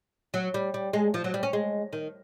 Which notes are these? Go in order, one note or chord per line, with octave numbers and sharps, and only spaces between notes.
F#3
G3
G3
G#3
F3
F#3
G3
C#4
G#3
D#3